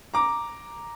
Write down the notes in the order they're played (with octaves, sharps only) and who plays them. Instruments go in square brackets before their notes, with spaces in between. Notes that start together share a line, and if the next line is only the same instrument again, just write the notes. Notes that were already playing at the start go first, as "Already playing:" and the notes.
[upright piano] A#5 D6